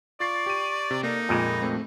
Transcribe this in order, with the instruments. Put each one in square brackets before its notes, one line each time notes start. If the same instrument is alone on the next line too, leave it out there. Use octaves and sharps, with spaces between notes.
[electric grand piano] F4 A6 C7 [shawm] D5 [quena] C#6
[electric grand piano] G4 D#7
C3
[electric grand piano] A#3 A4 [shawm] D#4 [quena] D5
[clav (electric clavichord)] F2 A#2 G#3 [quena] B5
[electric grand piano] A3 C4